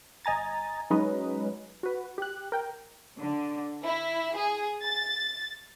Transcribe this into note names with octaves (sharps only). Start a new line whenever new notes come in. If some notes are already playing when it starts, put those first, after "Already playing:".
G1 D#5 G#5 A#5 A6
F#3 G#3 C#4 D#4 B4 D#5
F#4 B4
G4 F#6
A#4 G5
D3
E4
G#4
A6